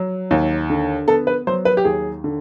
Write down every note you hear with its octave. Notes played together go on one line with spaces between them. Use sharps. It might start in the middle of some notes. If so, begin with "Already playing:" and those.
Already playing: F#3
D#2
D3
B3 A4
B4
F#3 C5
B4
G4
D#2 G#4
D3